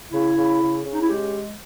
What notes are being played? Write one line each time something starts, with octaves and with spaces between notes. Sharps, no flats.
C#3 E4
C#3
C#3
C#3
D#4
E4
G#3 G4